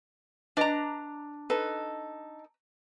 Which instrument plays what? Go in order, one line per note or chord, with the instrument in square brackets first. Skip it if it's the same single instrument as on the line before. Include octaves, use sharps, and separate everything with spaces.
[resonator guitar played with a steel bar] D4 A#5 [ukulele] B4 D5 D#5
[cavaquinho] D#4 A4 [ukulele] B4